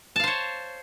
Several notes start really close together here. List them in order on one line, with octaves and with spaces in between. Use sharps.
A5 F5 C5 C#5